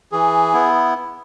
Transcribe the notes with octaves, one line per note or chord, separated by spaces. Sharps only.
E3 G#4
B3 E4